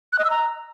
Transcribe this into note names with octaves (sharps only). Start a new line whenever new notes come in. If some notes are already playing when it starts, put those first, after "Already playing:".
F#6
D#5
E6
A#5